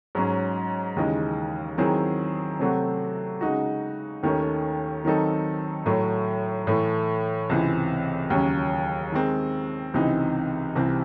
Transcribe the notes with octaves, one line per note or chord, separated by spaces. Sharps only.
G#2 F#3 C#4
D#2 C#3 E3 G#3 D#4
D#3 F#3 C4 E4 G#4
C3 F#3 A3 C4 F#4
C#3 G#3 D#4 F#4
D#2 D#3 A3 C#4
D#3 F#3 C4 D#4 A4
A2 F#3 A3
A2 E3 A3
C#2 C3 E3 C4
D#2 C#3 F#3 C#4
D#3 G#3 C4
C#2 C3 E3 C4 D#4
C2 C3 E3 C4